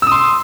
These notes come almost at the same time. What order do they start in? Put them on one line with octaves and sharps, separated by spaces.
E6 D#6 C6